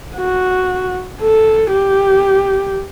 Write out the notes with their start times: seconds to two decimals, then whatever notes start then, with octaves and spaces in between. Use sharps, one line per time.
0.17 F#4
1.22 A4
1.73 G4